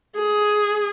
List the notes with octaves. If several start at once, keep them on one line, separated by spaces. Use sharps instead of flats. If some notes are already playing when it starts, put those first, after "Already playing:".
G#4